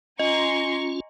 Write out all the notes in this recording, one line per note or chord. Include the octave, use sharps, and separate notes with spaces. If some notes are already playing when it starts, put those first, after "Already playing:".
C#4 F4 D#5 G#5 A#5 C6 C#6